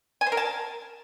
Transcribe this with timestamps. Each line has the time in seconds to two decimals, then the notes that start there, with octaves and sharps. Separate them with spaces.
0.21 G#5
0.27 C5
0.32 A#4
0.37 A5